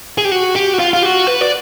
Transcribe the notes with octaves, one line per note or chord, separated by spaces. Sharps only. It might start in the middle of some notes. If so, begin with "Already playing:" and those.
G#4
G4
F#4
G4
F#4
F4
F4
F#4
B4
D5